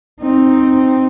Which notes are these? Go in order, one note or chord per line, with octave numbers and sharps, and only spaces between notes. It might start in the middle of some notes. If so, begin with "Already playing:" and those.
C4 D#4